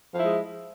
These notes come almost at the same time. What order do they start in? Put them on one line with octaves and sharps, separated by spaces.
F3 E4 G#3